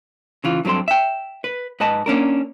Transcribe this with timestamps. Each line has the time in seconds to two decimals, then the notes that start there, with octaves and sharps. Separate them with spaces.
0.44 C#3 E3 F4
0.65 G2 F#3 C4 A4 C6
0.88 E5 G5
1.44 B4
1.80 G#2 B4 D#5 A5
2.06 A#3 C#4 D4 A#4